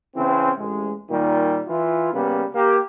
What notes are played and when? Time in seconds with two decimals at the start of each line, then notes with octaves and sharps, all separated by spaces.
0.16 C#3 E3 C4
0.58 A1 G#3
1.10 A#2 D#3 G3
1.68 E3 E4 F4
2.13 C#3 G3 A#3 B3
2.55 A#3 G4